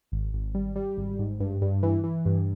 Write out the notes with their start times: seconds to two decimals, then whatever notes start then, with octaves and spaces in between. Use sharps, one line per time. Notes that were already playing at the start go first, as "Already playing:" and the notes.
0.12 G#1
0.34 G#1
0.55 G3
0.76 G3
0.97 G#1
1.19 G#2
1.40 G2
1.61 G2
1.83 E3
2.04 E3
2.26 G2